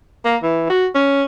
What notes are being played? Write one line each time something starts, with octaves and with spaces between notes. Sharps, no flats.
A#3
E3
F#4
C#4